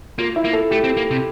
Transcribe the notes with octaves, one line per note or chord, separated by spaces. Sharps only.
A#3 F4
E4
A#3
A4
A3 G4
C4
A#3
C3